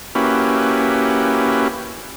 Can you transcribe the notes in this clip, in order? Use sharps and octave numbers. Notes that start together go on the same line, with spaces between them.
A#3 C#4 E4 F#4 G4 B4